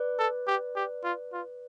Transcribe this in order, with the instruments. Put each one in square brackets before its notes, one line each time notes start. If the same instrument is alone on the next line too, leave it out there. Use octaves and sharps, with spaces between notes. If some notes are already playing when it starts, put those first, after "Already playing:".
Already playing: [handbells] B4 D5
[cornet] A4
G4
G4
F4
F4